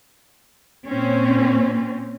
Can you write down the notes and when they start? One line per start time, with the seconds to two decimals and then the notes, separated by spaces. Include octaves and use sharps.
0.87 A#2 C4 C#4